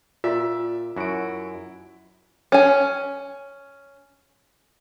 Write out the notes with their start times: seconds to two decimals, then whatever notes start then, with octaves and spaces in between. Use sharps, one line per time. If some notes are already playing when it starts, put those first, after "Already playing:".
0.24 A#2 F4 D5 E5 E6
0.96 F#2 E4 F#4 D7
2.52 C#4 G#5